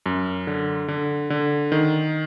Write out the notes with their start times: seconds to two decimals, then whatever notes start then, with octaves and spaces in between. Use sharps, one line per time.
0.06 F#2
0.47 D3
0.88 D3
1.30 D3
1.72 D#3